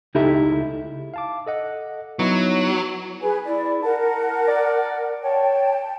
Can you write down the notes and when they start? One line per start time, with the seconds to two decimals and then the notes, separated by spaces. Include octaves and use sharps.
0.15 C#2 D#4 E4 G4 A4 E5
1.14 F5 A5 D6
1.46 A4 D#5 F#5
2.19 F#3 B3 D#4 E4
3.22 G#4 B4 G#5
3.45 E4 D5
3.83 A#4 F#5 A5
4.48 D5
5.24 C#5 G5 A5